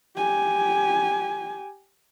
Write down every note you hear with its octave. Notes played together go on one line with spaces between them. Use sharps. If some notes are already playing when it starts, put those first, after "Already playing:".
G4 G#5